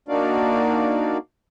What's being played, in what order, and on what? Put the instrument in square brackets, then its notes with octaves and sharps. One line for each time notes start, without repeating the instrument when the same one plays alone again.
[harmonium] A#3 D4 D#4 F#4 D5 F5